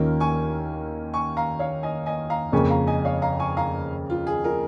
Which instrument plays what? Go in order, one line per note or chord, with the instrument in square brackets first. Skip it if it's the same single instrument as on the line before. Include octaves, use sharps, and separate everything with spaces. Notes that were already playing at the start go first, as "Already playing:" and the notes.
Already playing: [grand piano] D#2 D#3 A#3 C#4 [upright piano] F4 A#4
[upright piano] G#5 C#6
G#5 C#6
F5 A#5
C#5 F5
D#5 G#5
D#5 G#5
F5 A#5
[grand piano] F2 C#3 A#3 [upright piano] G#5 C#6
[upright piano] F5 A#5
D#5 G#5
C#5 F5
F5 A#5
G#5 C#6
F5 A#5
F4
G#4
F4 A#4